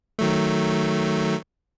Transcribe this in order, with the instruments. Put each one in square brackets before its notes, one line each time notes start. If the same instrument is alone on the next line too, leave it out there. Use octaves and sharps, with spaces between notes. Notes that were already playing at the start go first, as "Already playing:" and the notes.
[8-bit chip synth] D#3 F#3 A3